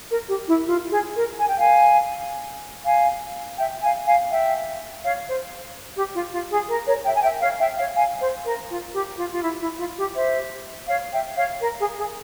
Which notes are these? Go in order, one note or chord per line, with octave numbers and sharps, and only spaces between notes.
A#4
G4
E4
F4
G#4
A#4
G#5
G5
F5 G#5
F5 G#5
E5 G5
F5 G#5
F5 G#5
E5 G5
C#5 F5
C5
G4
F4
F4
G#4
A#4
A#4 C#5
E5 G5
G#5
E5 G5
C#5 F5
E5 G5
C#5 F5
F5 G#5
C5
A#4
F4
G4
F4
F4
E4
E4
F4
G4
C5 E5
C#5 F5
E5 G5
C#5 F5
A#4
G#4
G#4